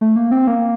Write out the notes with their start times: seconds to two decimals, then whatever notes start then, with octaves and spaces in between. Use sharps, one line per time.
0.01 A3
0.16 A#3
0.31 C4
0.47 A#3